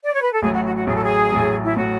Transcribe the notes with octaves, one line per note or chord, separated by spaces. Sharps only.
D5
C#5
B4
A4
A1 A2 F#3 G#4
F#4
F#4
F#4
A1 A2 F#3 G#4
A4
G#4
A1 A2 F#3
E4
A2 F#3 F#4